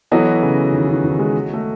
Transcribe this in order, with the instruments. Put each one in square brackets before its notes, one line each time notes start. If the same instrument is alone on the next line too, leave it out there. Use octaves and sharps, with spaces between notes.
[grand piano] E3 [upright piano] F#3 B3 F#4 A4 D#5
[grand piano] C#3
D#3
D#3
D#3
G#3
A3